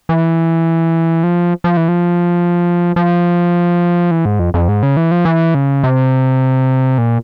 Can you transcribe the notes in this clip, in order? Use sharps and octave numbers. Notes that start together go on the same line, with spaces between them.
E3
F3
F3
E3
F3
F3
E3
G#2
F2
F2
G#2
C#3
E3
F3
E3
C#3
C3
A#2